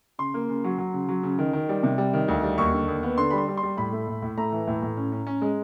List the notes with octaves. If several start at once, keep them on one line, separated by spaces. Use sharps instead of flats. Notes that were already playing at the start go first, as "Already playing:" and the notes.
C#3 C6
A#3
C#3
F#3
F#3
C#3
F#3
C#3
D#3
D#3
G3
C3
G3
D#3
D2
G3
D#2 C#6
D3
D#2
B3
D3 C6
G3 B5
C6
G3
C6
G3
A2 B5
A3
A2
A2
A3 A#5
E3
A2
A2
C#4
C#4
C#4
G#3